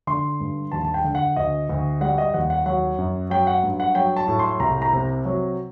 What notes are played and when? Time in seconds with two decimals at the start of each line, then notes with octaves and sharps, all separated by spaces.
0.07 D3 C6
0.40 G2
0.72 D#2 A5
0.85 A5
0.94 G5
1.04 D3
1.15 F#5
1.36 D2 D#5
1.70 D2
2.01 G3 F#5
2.18 D#5
2.34 D#2 F#5
2.50 F#5
2.66 F#3 F#5
2.98 F#2
3.30 F#3 G5
3.47 F#5
3.63 G2
3.80 F#5
3.95 F#3 G5
4.17 A5
4.28 A2
4.39 C6
4.60 C2 A#5
4.82 A#5
4.93 C3
5.25 F#3